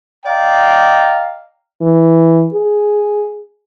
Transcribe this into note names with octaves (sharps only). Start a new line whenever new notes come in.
D5 D#5 F5 G5 A#5
E3
G#4